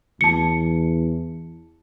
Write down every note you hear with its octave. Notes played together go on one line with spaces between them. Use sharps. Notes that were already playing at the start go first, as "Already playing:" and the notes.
E2 A5 C#7